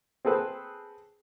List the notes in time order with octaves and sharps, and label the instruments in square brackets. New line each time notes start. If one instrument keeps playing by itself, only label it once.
[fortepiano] C4 G#4 A4 B4 C5